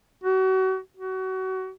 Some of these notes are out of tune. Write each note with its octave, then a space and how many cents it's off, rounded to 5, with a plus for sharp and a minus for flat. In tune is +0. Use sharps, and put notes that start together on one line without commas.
F#4 +35
F#4 +30